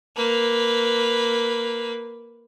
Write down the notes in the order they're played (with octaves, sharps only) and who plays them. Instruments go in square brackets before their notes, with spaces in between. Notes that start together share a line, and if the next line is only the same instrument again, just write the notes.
[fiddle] A#3 B4